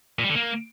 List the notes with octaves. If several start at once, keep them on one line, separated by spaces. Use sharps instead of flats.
A#2
G3
D3
A#3